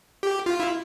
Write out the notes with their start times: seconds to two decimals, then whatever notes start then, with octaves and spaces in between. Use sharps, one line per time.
0.23 G4
0.46 F4
0.60 E4